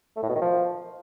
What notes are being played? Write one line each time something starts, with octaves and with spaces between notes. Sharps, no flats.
A3
A2
B2
D#3
F3